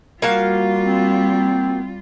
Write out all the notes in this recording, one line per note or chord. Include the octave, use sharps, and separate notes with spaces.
G3 A#3 F4 F#4 F5
C4